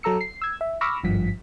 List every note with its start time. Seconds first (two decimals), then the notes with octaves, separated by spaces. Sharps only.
0.03 F#3 A4 A#5 E6 C#7
0.21 C7
0.42 E6 G#6
0.61 E5
0.81 B5 C#6 D6 E6 F6 A#6
1.04 G#1 G2 F3 B6